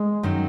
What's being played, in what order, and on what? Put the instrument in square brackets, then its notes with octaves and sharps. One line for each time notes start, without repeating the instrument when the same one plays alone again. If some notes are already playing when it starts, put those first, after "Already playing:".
Already playing: [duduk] G#3
[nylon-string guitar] F#2 D#3 F#3